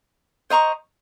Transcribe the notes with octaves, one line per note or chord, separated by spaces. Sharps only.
C5 D#5 A#5 C#6